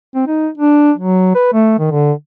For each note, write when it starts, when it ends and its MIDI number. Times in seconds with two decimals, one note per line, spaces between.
0.15 0.24 60
0.27 0.48 63
0.58 0.92 62
0.97 1.34 54
1.35 1.48 71
1.53 1.75 57
1.79 1.89 51
1.91 2.12 50